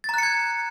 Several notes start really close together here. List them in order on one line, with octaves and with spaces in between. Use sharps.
A6 A#5 F#6 C#7 G#6